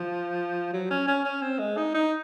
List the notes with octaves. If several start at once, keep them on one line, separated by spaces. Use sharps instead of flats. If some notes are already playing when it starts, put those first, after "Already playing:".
Already playing: F3
F#3
C#4
C#4
C#4
C4
G#3
D#4
D#4